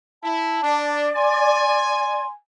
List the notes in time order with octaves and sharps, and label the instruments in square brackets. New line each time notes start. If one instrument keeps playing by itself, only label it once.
[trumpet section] E4 [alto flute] A5
[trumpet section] D4 [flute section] D5
[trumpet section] G#5 [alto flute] C6